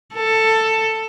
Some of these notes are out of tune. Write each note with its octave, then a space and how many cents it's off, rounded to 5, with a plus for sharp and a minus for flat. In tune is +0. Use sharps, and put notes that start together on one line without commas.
A4 +10